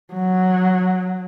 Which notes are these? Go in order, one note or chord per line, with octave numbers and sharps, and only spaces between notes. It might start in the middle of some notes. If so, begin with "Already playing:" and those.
F#3